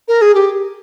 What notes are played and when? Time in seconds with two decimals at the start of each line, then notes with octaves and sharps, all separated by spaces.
0.08 A#4
0.22 G#4
0.35 G4